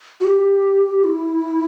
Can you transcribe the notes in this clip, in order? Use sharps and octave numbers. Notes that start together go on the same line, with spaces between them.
F#4
G4
E4